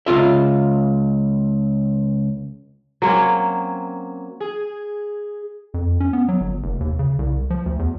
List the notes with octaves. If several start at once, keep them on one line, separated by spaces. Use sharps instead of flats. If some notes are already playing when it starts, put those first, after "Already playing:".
C#2 G2 F4 E5
F#3 A#3 C4 C#4
G#4
F2
C#4
B3
F#3
G1
F1
D#2
C#3
C2
F3
D2
E2